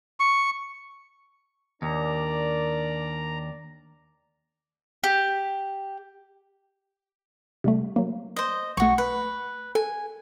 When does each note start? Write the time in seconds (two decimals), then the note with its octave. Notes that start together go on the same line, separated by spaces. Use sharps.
0.20 C#6
1.82 D#2 D4 A#4 D5 A#5
5.04 G4
7.64 C3 G3 A3
7.96 F#3 A#3
8.36 C5 D#5
8.77 B1 A3 F#4 C#6
8.98 B4
9.75 A4 G#5